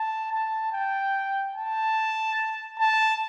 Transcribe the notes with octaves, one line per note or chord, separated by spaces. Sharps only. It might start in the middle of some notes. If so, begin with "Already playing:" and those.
Already playing: A5
A5
G5
A5
A5